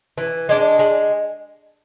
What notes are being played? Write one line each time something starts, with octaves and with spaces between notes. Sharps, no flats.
E3
G#3 D4
G#3